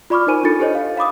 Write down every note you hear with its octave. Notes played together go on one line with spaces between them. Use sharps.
F4 D5 B5 C#6 D6 F6
D#4 A#4 C5 G#5 D#7
D4 F4 A4 A6 C#7
G4 A4 C5 C#5 D#5
F5
F5 B5 D6 D#6